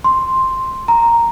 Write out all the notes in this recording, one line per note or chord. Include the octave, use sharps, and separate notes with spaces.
C6
A#5